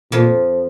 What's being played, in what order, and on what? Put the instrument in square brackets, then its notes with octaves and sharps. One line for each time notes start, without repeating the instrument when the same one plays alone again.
[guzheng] F2 F3 [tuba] A#2